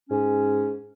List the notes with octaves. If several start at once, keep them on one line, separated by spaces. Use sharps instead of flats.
G#2 C#4